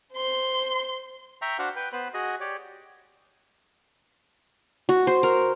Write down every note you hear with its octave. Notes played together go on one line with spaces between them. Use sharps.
C5 C6
E5 G5 A#5 C#6
D4 F#4 C5 F5 F#5
B4 G5
B3 B4 C5 B5
F#4 G#4 D#5
G4 C#5 D5
F#4
C5
A#4